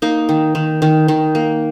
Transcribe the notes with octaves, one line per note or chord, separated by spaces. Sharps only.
A#3 D#4
D#3
D#3
D#3
D#3
A#3